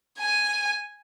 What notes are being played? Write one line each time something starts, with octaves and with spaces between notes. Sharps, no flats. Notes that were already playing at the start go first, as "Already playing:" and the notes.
G#5